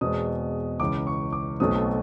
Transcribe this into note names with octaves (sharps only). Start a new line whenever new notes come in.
E2 B2 G#3 C4 D#6
C#2 C#3 E3 D6
C#6
D6
B1 B2 F#3 A3 C4 D#6